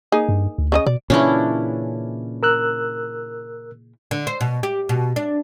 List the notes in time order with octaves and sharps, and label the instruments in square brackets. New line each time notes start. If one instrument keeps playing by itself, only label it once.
[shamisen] A#3 D#4 G#4
[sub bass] G2
D2
[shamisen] C#3 D#4 D#5
[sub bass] B2 [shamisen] D5
[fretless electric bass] A#2 C#3 E3 [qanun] C#4 D4 E4
[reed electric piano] A#4 E6 F#6
[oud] D3
C5
B2
G4
B2
D4